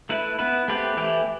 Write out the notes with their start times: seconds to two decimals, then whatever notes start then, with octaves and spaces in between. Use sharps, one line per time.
0.09 A3 E4 B4
0.39 B3 E4 B4
0.68 A3 C4 G4 B4
0.97 E3 A3 E4 G4